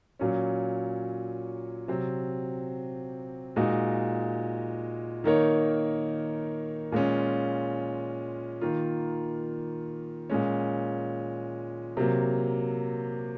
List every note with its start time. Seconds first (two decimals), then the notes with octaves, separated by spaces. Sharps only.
0.19 A#2 F#3 C#4
1.88 C3 F#3 C4
3.56 A#2 G#3 D#4 F#4
5.24 D#3 A#3 D#4 A#4 C#5
6.92 A#2 G#3 C#4 F4
8.61 D#3 A#3 F4
10.30 A#2 G#3 C#4
11.97 C3 F#3 A#3